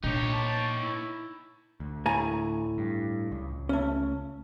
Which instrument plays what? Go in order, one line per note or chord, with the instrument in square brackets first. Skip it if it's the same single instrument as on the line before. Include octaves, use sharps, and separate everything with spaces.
[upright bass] A#2 [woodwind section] D4 G4 [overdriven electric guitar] D#4 C#5
[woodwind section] A5 D6
E4
[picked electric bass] D2
[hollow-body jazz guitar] A2 G#5 A#5
[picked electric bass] G2
C#2
[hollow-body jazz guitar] A3 C#4